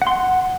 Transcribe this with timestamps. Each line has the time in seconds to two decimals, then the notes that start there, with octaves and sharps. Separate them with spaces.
0.02 F#5
0.07 C6
0.12 F#5